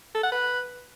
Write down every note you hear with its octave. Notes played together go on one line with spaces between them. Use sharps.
A4
F#5
B4